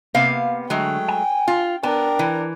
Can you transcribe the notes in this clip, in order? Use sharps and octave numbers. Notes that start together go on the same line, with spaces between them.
C3 A#3 B3 F5
D3 F#3 G#3 A3 G5
G#5
F4
B3 D4 A#4 G5
E3